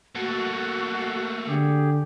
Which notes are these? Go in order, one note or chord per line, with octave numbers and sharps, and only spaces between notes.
A3 A#3 F#4 A4 F#5
D3 G4 G#4